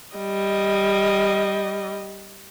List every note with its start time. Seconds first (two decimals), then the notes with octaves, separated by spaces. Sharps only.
0.16 G3 D#5